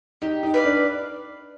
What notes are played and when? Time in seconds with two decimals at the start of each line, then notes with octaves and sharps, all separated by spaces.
0.22 D#4 G4
0.43 D#4
0.54 B4 D5 F5
0.64 D4